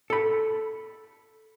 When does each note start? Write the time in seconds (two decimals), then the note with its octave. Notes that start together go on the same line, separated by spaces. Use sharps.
0.10 A4 B5